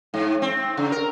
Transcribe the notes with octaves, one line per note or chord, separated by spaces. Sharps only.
G#2
C4
C#3
A#4